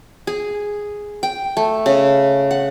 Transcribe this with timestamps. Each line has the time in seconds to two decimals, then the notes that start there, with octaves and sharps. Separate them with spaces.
0.27 G#4
1.23 G5
1.57 A3
1.86 C#3
2.51 F#5